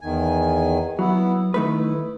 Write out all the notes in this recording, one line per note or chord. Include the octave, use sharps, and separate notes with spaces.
E2 D#3 G#5
F#3 B3 E4
D#3 A3 E4 B4